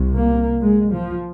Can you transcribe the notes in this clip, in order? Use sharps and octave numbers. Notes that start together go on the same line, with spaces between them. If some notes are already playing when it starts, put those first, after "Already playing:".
Already playing: C2 C3
A#3
G#3
F3